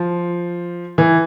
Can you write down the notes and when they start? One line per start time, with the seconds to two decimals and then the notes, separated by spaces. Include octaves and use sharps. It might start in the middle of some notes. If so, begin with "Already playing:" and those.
Already playing: F3
0.98 E3